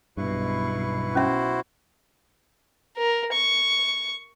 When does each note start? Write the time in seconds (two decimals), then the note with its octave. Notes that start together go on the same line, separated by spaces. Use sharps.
0.17 B1 G2 B2 E4 B4 C#6
1.15 C#4 E4 F#4 C5 E5
2.97 A#4
3.33 C#6